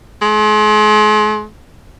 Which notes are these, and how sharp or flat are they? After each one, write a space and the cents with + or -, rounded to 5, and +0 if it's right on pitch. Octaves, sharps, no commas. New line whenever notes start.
G#3 +40